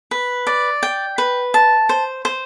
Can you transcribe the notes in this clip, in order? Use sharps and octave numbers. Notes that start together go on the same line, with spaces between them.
B4
D5
G5
B4
A5
C5
C5